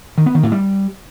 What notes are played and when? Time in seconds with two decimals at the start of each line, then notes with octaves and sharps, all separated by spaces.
0.18 D#3
0.26 B3
0.35 D#3
0.43 A2
0.52 G3